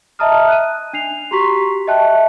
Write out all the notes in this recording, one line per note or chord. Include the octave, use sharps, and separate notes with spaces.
D#5 E5 A5 A#5 D#6 F6
F#6 D#7
D4 C7 F7
F#4 G4 A#5 C6 C#6 B6
D#5 E5 G5 A5 F#6